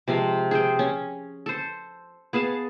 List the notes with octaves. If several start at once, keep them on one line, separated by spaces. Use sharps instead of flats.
C3 F3 G#3 F5
G#4 C5 G5
C#4
A4 C5
B3 G#4 F5 A5